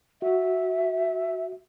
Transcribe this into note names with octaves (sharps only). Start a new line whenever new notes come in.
F#4 E5